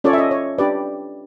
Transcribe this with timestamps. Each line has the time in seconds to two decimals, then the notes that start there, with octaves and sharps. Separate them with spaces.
0.04 C#4 F4 A4 C#5 D5
0.13 E5
0.18 D#5
0.31 C#5
0.58 D4 G4 B4 D5